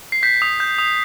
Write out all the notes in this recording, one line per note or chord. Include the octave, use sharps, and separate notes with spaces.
C7
G6 B6
D#6
G6
D#6